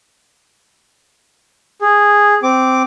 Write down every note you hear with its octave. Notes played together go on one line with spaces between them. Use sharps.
G#4
C4 D6